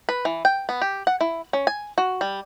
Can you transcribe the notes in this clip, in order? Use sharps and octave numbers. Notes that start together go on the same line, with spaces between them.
B4
E3
G5
B3
G4
F#5
E4
C#4
G#5
F#4
G3